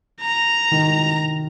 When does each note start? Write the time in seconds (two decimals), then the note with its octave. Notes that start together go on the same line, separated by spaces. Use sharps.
0.21 A#5
0.71 D#3